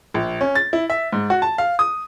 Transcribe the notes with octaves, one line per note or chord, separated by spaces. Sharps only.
A#1
C#4
A6
E4
E5
G#2
F#4
A5
F5
D#6